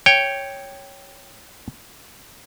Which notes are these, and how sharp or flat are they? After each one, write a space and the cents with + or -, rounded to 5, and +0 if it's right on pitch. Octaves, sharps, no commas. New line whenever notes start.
C#5 +0 G5 +0